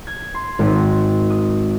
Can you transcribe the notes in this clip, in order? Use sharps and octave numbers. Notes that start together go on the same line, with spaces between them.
G#6
C6
G#1
D#6